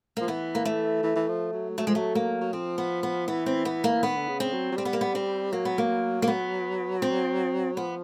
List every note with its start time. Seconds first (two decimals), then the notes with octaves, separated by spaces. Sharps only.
0.17 F3 A#3
0.28 E3 B3
0.55 A#3
0.65 A3
1.04 E3
1.16 E3
1.29 F3
1.53 F#3
1.78 F#3 A3
1.87 F3 G#3
1.95 F#3 A3
2.15 A#3
2.41 F#3
2.52 F3 C4
2.78 B3
3.03 B3
3.28 E3 B3
3.46 C4
3.65 B3
3.84 A#3
4.03 D#3 B3
4.17 D3
4.28 C#3
4.40 C4
4.53 F#3
4.72 F#3
4.77 G3 C4
4.85 B3
4.93 A#3
5.01 B3
5.15 C4
5.53 F#3 A#3
5.65 B3
5.78 A#3
6.22 A#3
6.28 B3
7.02 C4
7.77 F3 B3